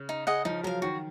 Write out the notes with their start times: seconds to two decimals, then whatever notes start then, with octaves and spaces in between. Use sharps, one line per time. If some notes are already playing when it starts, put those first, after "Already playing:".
Already playing: C#3
0.09 D#4
0.27 G#4 D#5 F#5
0.45 F3 D#4
0.63 F#3 A#4 F5
0.82 D#3 F#4